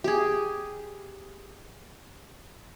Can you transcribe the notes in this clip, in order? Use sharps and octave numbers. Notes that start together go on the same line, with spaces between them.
G4 G#4